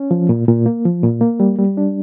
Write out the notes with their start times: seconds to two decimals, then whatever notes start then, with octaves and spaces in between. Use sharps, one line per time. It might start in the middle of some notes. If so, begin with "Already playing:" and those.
Already playing: C#4
0.11 F3
0.29 A#2
0.48 A#2
0.66 A#3
0.85 F3
1.03 A#2
1.21 A#3
1.40 G3
1.59 G3
1.77 D4